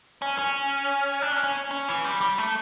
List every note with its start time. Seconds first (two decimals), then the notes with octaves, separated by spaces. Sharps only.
0.22 C#4
0.39 C#4
1.22 D4
1.32 C#4
1.44 C#4
1.71 C#4
1.88 E3
2.04 G3
2.21 G3
2.38 A3